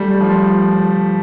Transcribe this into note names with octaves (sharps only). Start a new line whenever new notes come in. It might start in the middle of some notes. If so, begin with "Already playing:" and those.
Already playing: G3 A3
F3